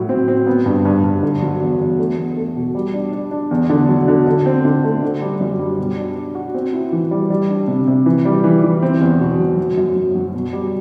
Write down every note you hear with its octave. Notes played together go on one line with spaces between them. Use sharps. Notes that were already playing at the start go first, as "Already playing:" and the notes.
Already playing: A2 F#3
C4
C4
B3
G2
G2
G2
D3
F#3
E2
E2
A3
E2
A3
B2
G3
D4
D4
D4
E2
D3
F#3
D3
D3
C4
D3
A3
D3
G3
F#2
G3
B2
D4
D4
F#4
C4
E4
E3
G3
G3
D4
C3
C3
E3
G3
E3
E3
C4
E2
B2
F#3
F#3
F#2
F#2
F#3
B2
G3